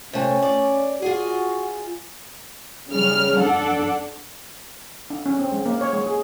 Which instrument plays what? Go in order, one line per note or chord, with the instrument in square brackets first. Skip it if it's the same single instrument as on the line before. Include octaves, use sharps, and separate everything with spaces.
[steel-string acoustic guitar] C3 A3 [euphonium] C#4
[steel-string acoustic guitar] D5
[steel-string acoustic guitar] F4 G#4 [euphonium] F#4
[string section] C#3 G3 F6
D4 A4 F#5
[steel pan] D4
C#4
C4
G#3
A#3
C#5
G#3
G#4